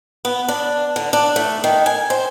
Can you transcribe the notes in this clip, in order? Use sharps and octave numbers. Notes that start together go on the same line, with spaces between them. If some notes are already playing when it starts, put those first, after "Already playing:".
B3
D4
D3
D4
A3
D#3
G#5
C5